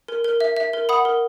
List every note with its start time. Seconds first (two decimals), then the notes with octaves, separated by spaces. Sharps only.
0.08 A#4
0.24 A#4
0.40 E5
0.57 E5
0.73 A#4
0.89 F#5 B5 D#6
1.05 A#4